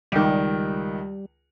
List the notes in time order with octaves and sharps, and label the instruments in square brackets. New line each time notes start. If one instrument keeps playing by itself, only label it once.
[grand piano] C#2 D#3 [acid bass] G3